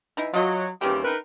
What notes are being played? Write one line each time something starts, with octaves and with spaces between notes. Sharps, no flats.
E3 D#4 E4
F#3 F4 D#5
D#2 C#3 E3 G3 C4 G4
D#4 A#4 B4